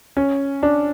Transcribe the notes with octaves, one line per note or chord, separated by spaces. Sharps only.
C#4
D4